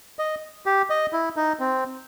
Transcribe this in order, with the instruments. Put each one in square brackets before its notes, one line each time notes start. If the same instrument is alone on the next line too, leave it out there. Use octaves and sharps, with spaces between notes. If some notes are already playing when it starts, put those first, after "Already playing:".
[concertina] D#5
G4
D#5
E4
D#4
C4